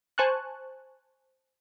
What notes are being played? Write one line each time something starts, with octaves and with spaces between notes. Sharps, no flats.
C5 G#5 A5 C#6 F#6